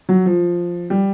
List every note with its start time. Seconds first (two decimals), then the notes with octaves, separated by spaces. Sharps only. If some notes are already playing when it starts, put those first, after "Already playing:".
0.09 F#3
0.26 F3
0.90 G3